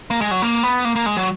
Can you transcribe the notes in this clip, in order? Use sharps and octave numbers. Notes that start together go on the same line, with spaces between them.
A#3
G#3
F#3
A#3
B3
A#3
A#3
G#3
F#3